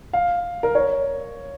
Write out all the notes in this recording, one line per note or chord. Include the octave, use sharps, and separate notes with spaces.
F5
A#4
C#5